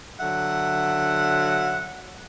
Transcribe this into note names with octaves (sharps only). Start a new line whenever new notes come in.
D3 F#3 E5 F#5